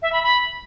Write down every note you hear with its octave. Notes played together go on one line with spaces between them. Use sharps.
E5
B5
B5